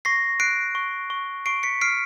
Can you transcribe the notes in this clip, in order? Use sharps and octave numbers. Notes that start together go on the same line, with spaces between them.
C#6 A#6 C7
F#6 C7 D7
C#6
C#6
C#6 C7 D7
B6 C#7
F6 C7 D7